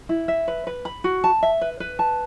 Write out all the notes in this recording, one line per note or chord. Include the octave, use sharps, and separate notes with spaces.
E4
E5
B4
B4
B5
F#4
A5
E5
B4
B4
A5